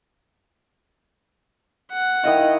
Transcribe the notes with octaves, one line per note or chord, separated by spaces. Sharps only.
F#5
D#3 E4 D#5 F5